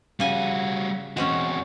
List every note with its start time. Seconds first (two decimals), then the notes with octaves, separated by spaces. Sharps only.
0.20 C#3 G3 F#4 G#5
1.17 E2 G#3 C4 C#4 F#4